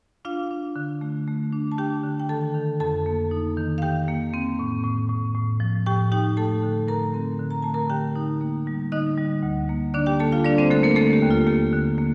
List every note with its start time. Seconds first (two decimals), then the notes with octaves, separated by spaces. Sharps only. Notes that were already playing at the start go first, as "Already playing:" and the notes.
0.25 D4 F4 F5
0.51 D4
0.76 D3
1.01 A3
1.28 A3
1.53 D4
1.72 A5
1.78 D4 G4 G5
2.03 D3
2.20 G5
2.29 D#3 A4 A5
2.54 D#3
2.80 F2 A4 A5
3.06 A#3
3.31 D#4
3.57 D#3
3.78 F5
3.82 D#3 G4 G5
4.08 A#3
4.34 C4
4.59 A2
4.84 A2
5.10 A2
5.35 A2
5.60 F3
5.86 A2 G4 G5
6.12 D#4 G4 G5
6.37 A3 A4 A5
6.63 D3
6.88 A3 A#4 A#5
7.14 C4
7.40 D3
7.51 A#5
7.62 A3 A5
7.74 A#4 A#5
7.90 D3 G4 G5
8.16 D#4
8.41 A#3
8.67 G3
8.92 D3 D#4 D#5
9.18 G3
9.43 D2
9.69 A#3
9.94 D3 D4 D5
10.06 G4 G5
10.20 A#3 A4 A5
10.32 F4 F5
10.45 G3 D4 D5
10.58 C4 C5
10.70 D3 A3 A4
10.83 A#3 A#4
10.96 A3 A#3 A4
11.13 G4
11.22 D#2
11.30 F4
11.47 A#3 G4
11.73 D3
11.98 A#3